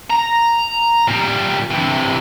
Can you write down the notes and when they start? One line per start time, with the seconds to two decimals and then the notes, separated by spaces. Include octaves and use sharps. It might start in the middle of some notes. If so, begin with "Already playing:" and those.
0.10 A#5
1.08 A#2 G3
1.71 C3 E3